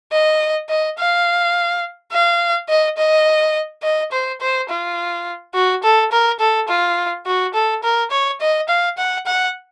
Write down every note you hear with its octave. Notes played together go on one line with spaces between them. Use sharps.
D#5
D#5
F5
F5
D#5
D#5
D#5
C5
C5
F4
F#4
A4
A#4
A4
F4
F#4
A4
A#4
C#5
D#5
F5
F#5
F#5